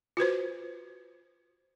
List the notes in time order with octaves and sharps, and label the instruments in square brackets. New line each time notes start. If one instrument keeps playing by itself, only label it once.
[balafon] F4 F#4 B4 C5